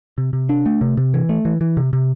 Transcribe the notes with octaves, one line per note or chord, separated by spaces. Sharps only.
C3
C3
D4
A3
C3
C3
E3
A3
E3
E3
C3
C3